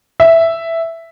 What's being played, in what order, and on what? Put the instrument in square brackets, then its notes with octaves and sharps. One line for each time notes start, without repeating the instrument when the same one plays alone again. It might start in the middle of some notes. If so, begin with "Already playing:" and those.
[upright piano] E5